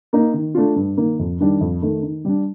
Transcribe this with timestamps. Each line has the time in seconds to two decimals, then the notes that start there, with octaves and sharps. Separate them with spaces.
0.13 A#3 D#4
0.33 D#3
0.55 A3 D4 F4
0.76 G2
0.97 D#3 A#3
1.19 F2
1.40 D#3 G3 D4
1.61 F2
1.82 D#3 A3
2.03 D#3
2.25 G3 D4